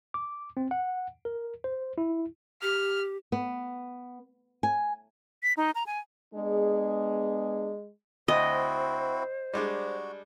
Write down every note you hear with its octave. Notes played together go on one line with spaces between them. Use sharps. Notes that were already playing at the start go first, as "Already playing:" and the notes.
D6
C4
F#5
A#4
C5
E4
G4 F6
B3
G#5
B6
D#4
A#5
G#5
G#3 B3 D4 G#4
D2 C4 E4 F#4 C5 D#5
G3 G#3 D4 F#4